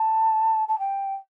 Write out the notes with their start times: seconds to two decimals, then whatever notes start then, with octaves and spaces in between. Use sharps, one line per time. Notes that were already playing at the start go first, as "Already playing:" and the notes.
Already playing: A5
0.68 A5
0.79 G5